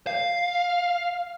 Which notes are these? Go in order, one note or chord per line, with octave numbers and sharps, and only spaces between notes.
F5